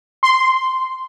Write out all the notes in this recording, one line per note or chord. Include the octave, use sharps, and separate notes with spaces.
C6